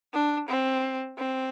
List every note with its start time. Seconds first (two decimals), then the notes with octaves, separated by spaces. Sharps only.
0.13 D4
0.48 C4
1.18 C4